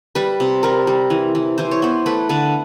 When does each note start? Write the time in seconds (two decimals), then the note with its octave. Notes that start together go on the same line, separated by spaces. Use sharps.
0.15 G3 B4
0.40 C3
0.63 G3 A#4
0.87 G3
1.10 E3
1.35 E3
1.58 E3 C5
1.71 C#5
1.82 B3 C5
2.06 A3 B4
2.29 D3 B4